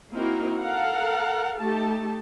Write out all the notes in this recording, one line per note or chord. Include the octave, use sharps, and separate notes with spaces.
A#3 C4 D#4 E4 F#4 A#4
A4 A#4 F5 F#5
A3 D#4 G4 A4 A5